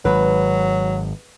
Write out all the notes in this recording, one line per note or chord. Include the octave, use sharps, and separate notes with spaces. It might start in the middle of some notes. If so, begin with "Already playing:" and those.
G#1 F#3 B4